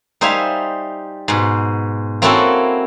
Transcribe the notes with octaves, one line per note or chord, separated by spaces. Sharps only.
G3 D#4 C5 E5 F5 G#5
G#2 B2
A#3 C4 C#4 E4 F#4 A4